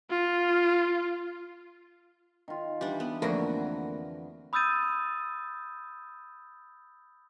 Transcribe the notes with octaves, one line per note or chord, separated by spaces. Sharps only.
F4
D#3 F4
E3 G3 D4
B3
F2 D3 A3 A#3 C4 F#4 A#4 B4
B5 D#6 E6 G6 A6 D#7